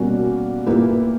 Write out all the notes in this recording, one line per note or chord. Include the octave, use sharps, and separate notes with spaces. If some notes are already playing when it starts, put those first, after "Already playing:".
Already playing: B2 G3 A#3 C#4 F#4
A#2 A#3 E4 G4 B4